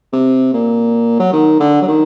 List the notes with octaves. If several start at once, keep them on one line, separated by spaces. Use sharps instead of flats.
C3
A#2
F#3
D#3
D3
F#3
D#3